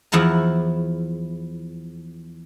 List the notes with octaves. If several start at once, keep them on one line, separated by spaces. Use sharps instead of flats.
E2 F3 E4 F#5 A#5